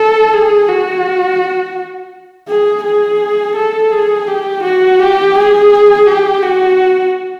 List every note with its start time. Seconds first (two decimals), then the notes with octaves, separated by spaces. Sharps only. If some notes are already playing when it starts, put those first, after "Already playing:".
Already playing: A4
0.33 G#4
0.68 F#4
2.49 G#4
2.84 G#4
3.56 A4
3.91 G#4
4.28 G4
4.63 F#4
5.00 G4
5.36 G#4
6.07 G4
6.43 F#4